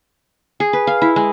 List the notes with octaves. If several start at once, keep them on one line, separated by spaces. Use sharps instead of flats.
G#4
B4
F5
E4
G#3